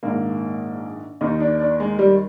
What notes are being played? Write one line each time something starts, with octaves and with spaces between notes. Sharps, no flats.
A#1 G#2 D#3 A#3
D#2 D#3 D#4
D4
D4
G#3
G3